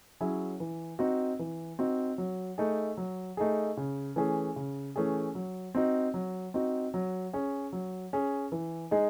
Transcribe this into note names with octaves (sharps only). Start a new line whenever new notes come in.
F#3 C#4 E4 G#4
E3
C4 D#4 F#4
E3
C4 D#4 F#4
F#3
A3 D#4 G#4
F#3
A3 D#4 G#4
C#3
E3 A3 C#4 G#4
C#3
E3 A3 C#4 G#4
F#3
C4 D#4 F#4
F#3
C4 D#4 F#4
F#3
C#4 G#4
F#3
C#4 G#4
E3
G#3 D#4 G#4